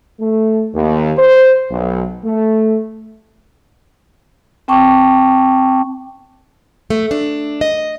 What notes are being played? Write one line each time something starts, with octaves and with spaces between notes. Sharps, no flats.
A3
D#2
C5
B1
A3
C4 G5 A5 C#6 D6
A3
D4
D#5